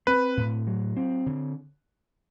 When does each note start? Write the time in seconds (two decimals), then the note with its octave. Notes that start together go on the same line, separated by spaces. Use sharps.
0.07 C4 B4
0.37 A2
0.67 F#3
0.97 C4
1.26 D3